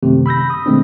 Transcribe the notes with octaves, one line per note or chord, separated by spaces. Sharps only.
F#2 C3 D#3 A3
B5 E6 G6 A#6
D#6
B2 D#3 G#3 A3 C4 D4